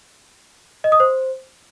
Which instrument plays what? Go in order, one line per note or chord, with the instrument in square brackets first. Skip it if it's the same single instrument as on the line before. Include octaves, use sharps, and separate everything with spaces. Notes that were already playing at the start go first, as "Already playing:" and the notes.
[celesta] D#5
D#6
C5